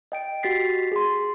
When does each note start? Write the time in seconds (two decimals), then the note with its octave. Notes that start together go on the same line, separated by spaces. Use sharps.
0.12 D#5 G5 D7
0.43 F#4 G4 A6 B6 C7
0.92 G#4 C6